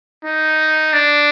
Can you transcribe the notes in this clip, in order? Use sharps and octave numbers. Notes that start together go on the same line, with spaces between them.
D#4
D4